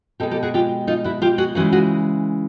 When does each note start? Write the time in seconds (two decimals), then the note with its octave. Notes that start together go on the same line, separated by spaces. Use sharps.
0.20 B2 G#3 G4 A4
0.31 G4 A4
0.43 F#4 G#4
0.54 F4 G4
0.87 D#4 F4
1.04 E4 F#4
1.22 F4 G4
1.38 F#4 G#4
1.55 C#3 E3 G#3 F#4 G#4
1.72 F#4 G#4